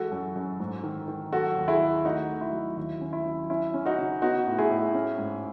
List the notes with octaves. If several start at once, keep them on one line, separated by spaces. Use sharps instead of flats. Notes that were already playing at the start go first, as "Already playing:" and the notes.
Already playing: E3 G#3 F#4 A4
F#2
F#2
G#2
D#3
D#3
F#3 F#4 A4
D#2
E4 G#4
D#2
A3 D#4 F#4
A3
E4
F#3
D#2 E4
C#4
E4
F#3
C#4 E4
C#4
D#4 F#4
C#3
B3 D#4 F#4
A2
E4 G#4
A2
C#4
G#2